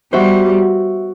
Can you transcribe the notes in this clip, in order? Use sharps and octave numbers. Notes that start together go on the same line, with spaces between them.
G3 B3 F#4 C5 E5